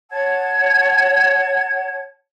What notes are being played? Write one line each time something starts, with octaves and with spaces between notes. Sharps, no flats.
C#5 F#5 A5 G#6